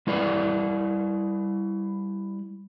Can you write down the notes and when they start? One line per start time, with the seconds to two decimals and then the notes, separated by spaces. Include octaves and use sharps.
0.07 G3 E4 B4 D5